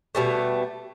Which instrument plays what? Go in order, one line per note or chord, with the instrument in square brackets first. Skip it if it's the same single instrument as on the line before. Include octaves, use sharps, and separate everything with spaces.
[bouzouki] B2 G3 A3